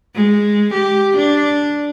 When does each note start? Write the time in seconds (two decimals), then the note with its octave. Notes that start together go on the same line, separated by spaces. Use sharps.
0.15 G#3
0.73 G4
1.17 D4